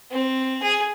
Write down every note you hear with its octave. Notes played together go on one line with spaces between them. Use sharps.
C4
G#4